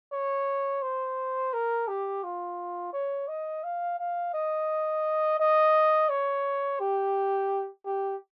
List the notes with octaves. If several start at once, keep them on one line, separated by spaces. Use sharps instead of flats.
C#5
C5
A#4
G4
F4
C#5
D#5
F5
F5
D#5
D#5
C#5
G4
G4